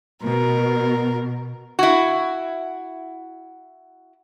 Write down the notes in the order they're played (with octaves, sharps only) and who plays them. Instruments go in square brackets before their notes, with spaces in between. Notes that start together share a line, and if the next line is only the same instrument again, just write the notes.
[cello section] B2 [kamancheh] A#4
[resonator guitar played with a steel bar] E4 F#4